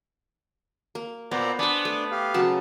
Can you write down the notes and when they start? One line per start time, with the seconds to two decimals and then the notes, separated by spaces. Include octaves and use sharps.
0.95 A#3
1.31 A#2 B3 C5 D5 A#5
1.59 B3 D4 C5 D5 G#5
1.85 A3
2.11 G4 F5
2.34 C#3 F#3 A5